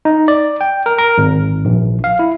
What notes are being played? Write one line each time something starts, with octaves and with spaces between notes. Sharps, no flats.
D#4
D5
G5
A#4
A#4
G#1
A#1
F5
E4